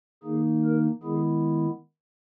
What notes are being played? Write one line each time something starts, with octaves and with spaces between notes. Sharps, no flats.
D#3 A#3 D#4 G#4
A#4
D#3 G#3 B3 E4 G#4